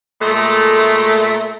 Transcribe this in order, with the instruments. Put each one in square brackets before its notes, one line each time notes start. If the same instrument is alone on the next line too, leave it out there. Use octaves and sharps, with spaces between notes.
[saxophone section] A#2 G#3 A3